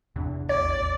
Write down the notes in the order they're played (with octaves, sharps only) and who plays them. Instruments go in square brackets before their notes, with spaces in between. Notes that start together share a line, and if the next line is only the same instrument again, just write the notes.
[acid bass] E2 [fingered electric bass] C3 D4
[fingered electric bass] A1 D#2 [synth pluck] C#5 [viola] D5